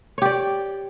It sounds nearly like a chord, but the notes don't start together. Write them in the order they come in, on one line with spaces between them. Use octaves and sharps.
C#5 G4 D5